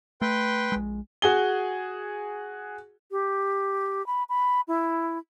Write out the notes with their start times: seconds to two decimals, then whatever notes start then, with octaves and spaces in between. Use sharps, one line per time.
0.21 A3 B4 G5 C6
0.72 A#1 G#3
1.22 F#4 G#4 G7
3.11 G4
4.07 B5
4.29 B5
4.68 E4